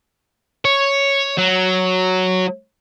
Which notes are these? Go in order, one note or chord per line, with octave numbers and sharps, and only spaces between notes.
C#5
F#3